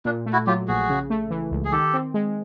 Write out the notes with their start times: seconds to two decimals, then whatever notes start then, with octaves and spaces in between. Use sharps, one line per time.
0.05 A#2 D4
0.26 A3
0.33 E4 F#4
0.47 F#3 F4 G4
0.68 A#1 F#4 G#4
0.89 C#3
1.10 A3
1.30 E3
1.51 C#2
1.65 G#4
1.72 D#3 G4 A4
1.94 C4
2.14 G#3